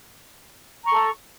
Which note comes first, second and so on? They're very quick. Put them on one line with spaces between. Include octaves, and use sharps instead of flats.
A#5 C#6 A4